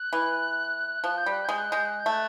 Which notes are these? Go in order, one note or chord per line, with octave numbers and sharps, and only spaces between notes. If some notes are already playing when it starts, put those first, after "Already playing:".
Already playing: F#6
E3
F3 F#6
G6
G3 F#6
G#3 G6
F#6
G#3 G6
F#6
G6
A3
F#6